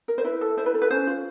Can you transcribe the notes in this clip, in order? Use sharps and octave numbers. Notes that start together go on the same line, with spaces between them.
A#4
C5
E4 B4
A4
E4 C5
B4
A4
B4
C#4 C5
F4